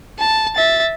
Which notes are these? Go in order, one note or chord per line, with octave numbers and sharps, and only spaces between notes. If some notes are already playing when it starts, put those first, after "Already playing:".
A5
E5 A6